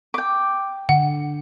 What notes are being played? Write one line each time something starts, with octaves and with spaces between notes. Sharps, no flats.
G5 D6
D3 F#5